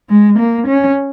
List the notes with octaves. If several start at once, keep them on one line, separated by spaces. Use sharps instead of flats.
G#3
A#3
C#4